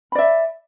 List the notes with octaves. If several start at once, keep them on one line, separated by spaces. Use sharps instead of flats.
D5 E5 B5